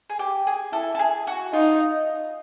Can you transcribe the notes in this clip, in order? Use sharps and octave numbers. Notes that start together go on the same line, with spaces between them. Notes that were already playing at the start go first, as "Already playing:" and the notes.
G#4
G4
G#4
E4 A4
A4
G#4
F#4
D#4 F4